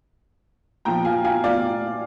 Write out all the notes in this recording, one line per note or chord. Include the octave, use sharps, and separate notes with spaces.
A#2 F3 G5 A#5
F5 G#5
F5 G#5
D5 F5